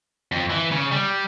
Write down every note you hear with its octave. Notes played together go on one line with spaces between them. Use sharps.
F2
E3
C#3
G3